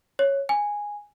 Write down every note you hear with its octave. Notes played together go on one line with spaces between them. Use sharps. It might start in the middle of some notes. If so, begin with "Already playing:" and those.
C#5
G#5